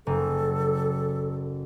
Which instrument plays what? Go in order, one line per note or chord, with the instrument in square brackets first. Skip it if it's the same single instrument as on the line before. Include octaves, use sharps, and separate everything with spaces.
[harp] F#1 [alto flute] A4